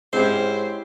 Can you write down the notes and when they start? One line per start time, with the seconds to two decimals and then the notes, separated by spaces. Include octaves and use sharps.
0.13 G#2 C4 C#4 E4 G4 C5